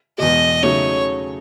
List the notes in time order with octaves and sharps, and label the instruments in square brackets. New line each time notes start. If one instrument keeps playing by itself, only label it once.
[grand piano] E2 B2 G#3 [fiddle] D#5
[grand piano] C#3 F#3 A3 D#4 [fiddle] C#5